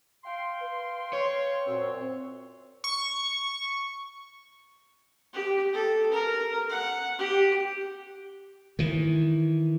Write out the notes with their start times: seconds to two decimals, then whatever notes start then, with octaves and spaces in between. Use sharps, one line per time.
0.25 F5 G5 C6
0.60 B4
1.13 C#5
1.66 F#2 A#2 C4 E6
2.84 C#6
5.33 G4
5.73 A4
6.12 A#4
6.69 F#5
7.19 G4
8.79 D#3 E3